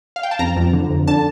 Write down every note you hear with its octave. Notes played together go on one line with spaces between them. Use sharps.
F5
G5
A5
F2 A#5
F2
D3
F2
D3 A5